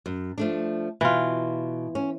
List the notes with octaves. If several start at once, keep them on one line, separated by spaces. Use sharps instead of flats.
F#2
F3 A3 D4
B2 E3 F4
C#4